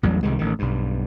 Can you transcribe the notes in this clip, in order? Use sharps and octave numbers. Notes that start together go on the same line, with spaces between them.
A1 E2 F#3 G3
C2 C3 D#3 G#3
A1 A2 D#3
B1 G2